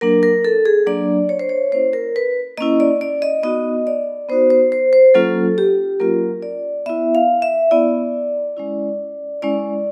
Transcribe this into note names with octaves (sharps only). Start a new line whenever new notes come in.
F#3 A#3 D4 A#4
A#4
A4
G#4
F#3 A#3 D4 D5
C#5
C5
C#5
A#3 C#4 E4 C5
A#4
B4
A#3 C#4 E4 D#5
D5
D5
D#5
B3 D#4 F#4 D#5
D5
B3 D#4 F#4 C5
C5
C5
C5
F#3 A#3 C#4 F4 A4
G4
F#3 A#3 C#4 F4 A#4
D5
B3 E4 E5
F5
E5
B3 E4 D5
G#3 C#4 E4
G#3 C#4 E4 D5